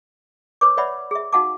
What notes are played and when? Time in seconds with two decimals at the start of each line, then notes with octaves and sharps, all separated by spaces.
0.61 B4 C#5 D6
0.77 B4 C#5 D5 E5 F#5 B5
1.11 G#4 E5
1.32 D#4 F#4 F5 F#5 A5 D6